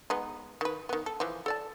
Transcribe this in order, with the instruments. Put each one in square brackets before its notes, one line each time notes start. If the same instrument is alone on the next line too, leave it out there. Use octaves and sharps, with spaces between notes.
[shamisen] G#3 B3 D#4
D#3 B4
D#3 B3
A4
E3 F3
A4 D5 A5